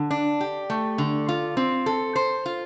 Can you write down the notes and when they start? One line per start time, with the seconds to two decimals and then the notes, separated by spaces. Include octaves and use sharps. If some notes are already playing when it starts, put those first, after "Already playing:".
Already playing: D3
0.11 D4
0.41 G4
0.70 A3
0.98 D3
1.29 F4
1.57 C4
1.86 A4
2.16 C5
2.46 F4